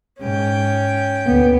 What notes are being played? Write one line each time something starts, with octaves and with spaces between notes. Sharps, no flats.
G#2 C#4 G5
D2 B3